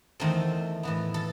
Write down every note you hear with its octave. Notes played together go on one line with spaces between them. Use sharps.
E2 D#3 A3 C4 A4
A2 E3 B3
A4